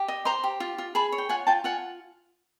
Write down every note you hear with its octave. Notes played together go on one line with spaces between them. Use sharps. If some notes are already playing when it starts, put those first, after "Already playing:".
Already playing: G4
D#5
C5 A#5 C6
G4
F4
F4
G#4 A5 B5
C#5
G5
F4 F#5 G#5
F4 G5 A5
F4 F#5 G#5